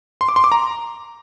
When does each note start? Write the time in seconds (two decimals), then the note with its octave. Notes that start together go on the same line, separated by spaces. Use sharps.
0.21 C6
0.29 D6
0.36 C6
0.44 D6
0.52 A#5